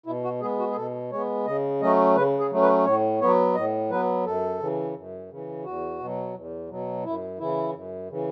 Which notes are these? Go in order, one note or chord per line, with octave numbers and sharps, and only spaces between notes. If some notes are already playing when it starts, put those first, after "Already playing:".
B2 E4
F#4
G#3 B3 G#4
F#4
G#4
B2 A4
G#3 B3 C#5
C#3 D#5
F#3 A3 C#4 D#5
C#3 B4
G#4
F#3 A3 C#4
B4
A2 C#5
F#3 B3 C#5
A2 D#5
F#3 B3 B4
F#2 A4
C#3 E3
F#2
C#3 E3
E2 F#4
B2
F#3
E2
B2 F#3
F#2 E4
C#3 E3 E4
F#2
C#3 E3